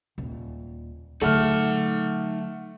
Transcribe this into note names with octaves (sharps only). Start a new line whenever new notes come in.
D#1
D3 F#3 A3 D#4 F#5 F6